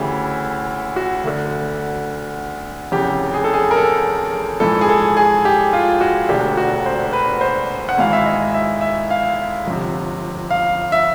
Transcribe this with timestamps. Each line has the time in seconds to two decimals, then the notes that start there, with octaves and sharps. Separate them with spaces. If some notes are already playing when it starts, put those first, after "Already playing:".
Already playing: D2 C#3 E3 G4
0.96 F#4
1.24 D2 D3
2.92 F1 E2 C#3 G4
3.34 G#4
3.44 A4
3.54 G#4
3.71 A#4
3.76 A4
4.60 A#1 G#2 E3 A4
4.81 G#4
4.89 A4
5.17 G#4
5.45 G4
5.73 F4
6.01 F#4
6.29 E1 D2 D3 G4
6.57 F#4
6.86 C5
7.13 B4
7.41 C5
7.89 F#5
7.97 G#1 G#2 E3 F5
8.13 E5
8.25 D#5
8.54 E5
8.81 E5
9.10 F5
9.67 G1 F2 C3
10.50 F5
10.92 E5